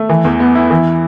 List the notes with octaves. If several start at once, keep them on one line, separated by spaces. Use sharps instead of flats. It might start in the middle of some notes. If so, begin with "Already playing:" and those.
Already playing: A3
E3
E2
B3
E4
E3